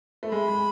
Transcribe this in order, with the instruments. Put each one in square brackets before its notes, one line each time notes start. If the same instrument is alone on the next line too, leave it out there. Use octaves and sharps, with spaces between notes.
[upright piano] A3
[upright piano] G#3 [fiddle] B5
[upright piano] G#3